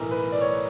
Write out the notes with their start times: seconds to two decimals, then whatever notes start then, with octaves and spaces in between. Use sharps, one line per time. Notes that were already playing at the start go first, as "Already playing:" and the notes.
Already playing: B1 A2 E3 A#4
0.11 B4
0.32 D5
0.41 C#5